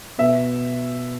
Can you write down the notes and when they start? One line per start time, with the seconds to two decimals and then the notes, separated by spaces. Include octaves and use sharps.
0.18 B2 E5